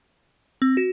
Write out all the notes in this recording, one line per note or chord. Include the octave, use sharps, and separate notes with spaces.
C4
F#4